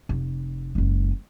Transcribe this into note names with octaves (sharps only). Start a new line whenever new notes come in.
F1
F#1 G#3